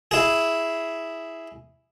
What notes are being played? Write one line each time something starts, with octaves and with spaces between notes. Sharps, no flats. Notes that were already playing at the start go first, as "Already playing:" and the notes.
E4 G#4